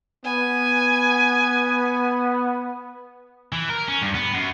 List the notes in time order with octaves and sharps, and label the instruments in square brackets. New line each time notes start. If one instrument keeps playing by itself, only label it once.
[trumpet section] B3 [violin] G#5
[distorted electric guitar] E3
A#4
C#4
G2
B3
F#2